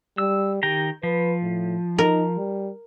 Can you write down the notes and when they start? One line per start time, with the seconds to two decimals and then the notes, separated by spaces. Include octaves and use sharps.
0.18 G3 E6
0.63 D#3 G4 G5 A#5
1.03 F3 B4
1.42 A2
1.98 D#4 A#4
2.38 G3